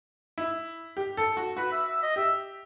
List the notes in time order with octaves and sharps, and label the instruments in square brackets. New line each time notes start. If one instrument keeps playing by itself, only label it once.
[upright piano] E4
G4
A4
F#4
[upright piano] F#4 [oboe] B4
[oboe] E5
E5
D#5
[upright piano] G4 [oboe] E5